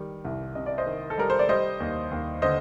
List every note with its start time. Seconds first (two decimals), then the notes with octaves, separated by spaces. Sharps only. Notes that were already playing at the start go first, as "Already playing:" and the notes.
Already playing: D#3 G3
0.25 C2
0.55 C3 D#5
0.66 D5
0.78 C5 D#5
0.87 D#3
1.10 A4
1.18 G3 A#4
1.30 C5
1.39 D5
1.49 G3 C5 D#5
1.80 D#2
2.11 D#2
2.42 D3 C5 D#5